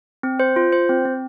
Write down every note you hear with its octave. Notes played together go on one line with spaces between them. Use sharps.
C4
C5
F4
C5
C4
C4